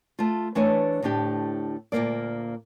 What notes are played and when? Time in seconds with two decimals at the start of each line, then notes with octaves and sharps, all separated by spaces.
0.19 A3 F4
0.55 E3 A3 D4 B4 C#5 G#5
1.02 D2 A2 A3 D4 G4
1.92 D2 A#2 F#3 A#3 D5